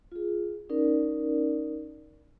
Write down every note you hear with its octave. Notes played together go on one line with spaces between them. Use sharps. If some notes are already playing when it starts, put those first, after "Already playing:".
F4 G#4
C#4 D#4 A#4 D5